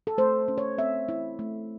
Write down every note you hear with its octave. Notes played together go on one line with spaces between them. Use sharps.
A4
A3 C5
C#4
C#5
C4 E5
E4
A3